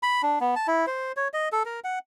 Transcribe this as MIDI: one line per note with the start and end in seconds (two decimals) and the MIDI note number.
0.03 0.22 83
0.23 0.39 62
0.41 0.55 59
0.56 0.67 81
0.67 0.86 64
0.87 1.12 72
1.17 1.28 73
1.34 1.49 75
1.52 1.63 69
1.66 1.80 70
1.84 1.99 78